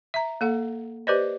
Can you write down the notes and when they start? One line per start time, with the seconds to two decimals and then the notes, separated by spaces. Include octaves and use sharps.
0.14 E5 A#5
0.41 A#3 A4 F#5
1.07 G4 B4 C5 D5 D#5